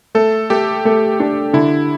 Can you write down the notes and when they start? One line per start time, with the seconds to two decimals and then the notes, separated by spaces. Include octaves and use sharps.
0.15 A3 A4
0.50 A3 G4
0.85 A3
1.20 D4
1.53 D3 E4